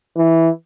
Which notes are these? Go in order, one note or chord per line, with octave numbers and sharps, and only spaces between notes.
E3